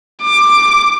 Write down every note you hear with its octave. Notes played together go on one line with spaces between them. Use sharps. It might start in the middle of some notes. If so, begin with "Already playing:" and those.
D6